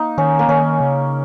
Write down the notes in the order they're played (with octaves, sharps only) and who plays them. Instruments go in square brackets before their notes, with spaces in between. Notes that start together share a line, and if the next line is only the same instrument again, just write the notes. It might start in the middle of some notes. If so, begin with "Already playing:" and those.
Already playing: [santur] A#3 D#4
[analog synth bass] D#3 [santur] C#4
[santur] A#3
[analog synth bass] D#3 [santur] C#4
[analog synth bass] C#3